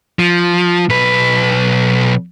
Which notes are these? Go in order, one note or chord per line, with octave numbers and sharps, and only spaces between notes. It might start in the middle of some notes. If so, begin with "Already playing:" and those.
F3
B1 B4